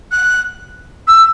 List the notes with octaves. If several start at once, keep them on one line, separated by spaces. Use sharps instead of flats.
F#6
E6